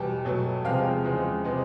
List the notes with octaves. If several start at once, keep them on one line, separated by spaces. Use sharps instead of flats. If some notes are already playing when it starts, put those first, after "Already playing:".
Already playing: E2 B2 G3 G5 A5
B2 F#3 A3
E2 C3 F3 G#3 F5 G5
E2 C#3 F3 G#3
C3 F3 G#3 B3